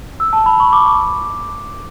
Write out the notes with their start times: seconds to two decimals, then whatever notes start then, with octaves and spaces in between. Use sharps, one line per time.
0.20 E6
0.33 A5
0.46 B5
0.60 C#6
0.73 D6
0.86 D6